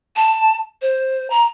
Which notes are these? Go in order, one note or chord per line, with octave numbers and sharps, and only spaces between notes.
A5
C5
A#5